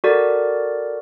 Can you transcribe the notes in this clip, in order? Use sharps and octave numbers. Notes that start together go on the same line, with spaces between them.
F#4 A4 A#4 D5